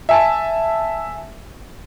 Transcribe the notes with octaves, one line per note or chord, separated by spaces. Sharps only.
E5 G#5 A5